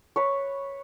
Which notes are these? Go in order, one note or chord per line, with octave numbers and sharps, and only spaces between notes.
B4 C#5